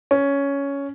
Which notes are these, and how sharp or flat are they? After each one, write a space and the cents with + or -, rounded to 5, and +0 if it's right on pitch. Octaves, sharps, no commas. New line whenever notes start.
C#4 +10